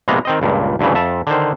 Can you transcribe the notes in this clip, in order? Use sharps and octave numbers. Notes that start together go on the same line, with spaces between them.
A#1 C3 G#3 A#3 B3 A#5
D#3 C4 D#5
C#2 G2 A#2
D2 G2 C#3 E3
F2 E5 A5
D3 D#3 C5